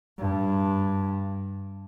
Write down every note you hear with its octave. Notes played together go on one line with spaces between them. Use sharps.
G2